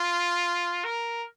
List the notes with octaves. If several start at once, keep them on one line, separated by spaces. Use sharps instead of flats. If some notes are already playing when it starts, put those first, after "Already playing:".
Already playing: F4
A#4